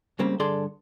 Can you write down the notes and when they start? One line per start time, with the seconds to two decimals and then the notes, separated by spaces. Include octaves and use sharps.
0.19 C#2 C#3 G3 A#3 C4
0.40 G2 D3 G#4 A4 D5 C6